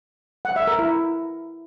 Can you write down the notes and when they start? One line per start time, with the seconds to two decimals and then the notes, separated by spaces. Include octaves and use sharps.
0.45 F#5
0.56 E5
0.67 A#4
0.79 E4